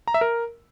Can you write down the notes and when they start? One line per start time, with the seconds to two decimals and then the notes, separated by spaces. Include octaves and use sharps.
0.08 A#5
0.14 E5
0.21 A#4